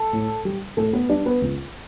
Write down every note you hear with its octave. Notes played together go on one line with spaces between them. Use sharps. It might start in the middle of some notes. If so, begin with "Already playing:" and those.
Already playing: A4
A2
G3
A2 A3 A4
B3 B4
G3 D4 D5
B3 B4
C#2